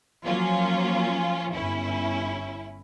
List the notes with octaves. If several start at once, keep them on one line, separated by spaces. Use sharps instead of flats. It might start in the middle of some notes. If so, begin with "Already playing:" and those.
F3 F#3 A#3 C#4 F4
G1 C#4 E4